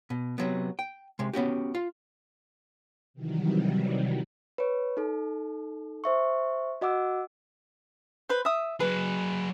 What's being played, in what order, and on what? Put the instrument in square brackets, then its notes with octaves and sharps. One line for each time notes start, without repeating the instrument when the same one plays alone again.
[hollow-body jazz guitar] B2
C3 F#3 B3
G5
C3 G#3
B3 C#4 F#4 G4
F4
[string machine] C3 D#3 E3 F#3 G3
[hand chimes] B4 C#5
D#4 A4
C5 E5 C#6
F#4 D#5 F#5 D6 E6
[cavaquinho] B4 C5
E5 D#6
[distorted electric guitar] F#3 G#4 [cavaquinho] B4